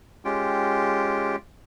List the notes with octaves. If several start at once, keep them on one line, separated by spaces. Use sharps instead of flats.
G#3 C#4 F4 G4 G5